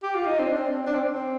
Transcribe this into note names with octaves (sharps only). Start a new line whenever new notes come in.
G4
F4
D#4
C4
D4
C4
D4
C4
D4
C4
D4
C4